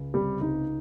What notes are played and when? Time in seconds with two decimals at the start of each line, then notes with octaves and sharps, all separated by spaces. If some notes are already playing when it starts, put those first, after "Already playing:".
Already playing: C#2
0.14 C3 G3 G4
0.41 C#2 D#4